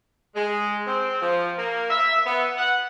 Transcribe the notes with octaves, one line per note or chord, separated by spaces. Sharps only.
G#3
C4
F3
A#3
E5
B3
F#5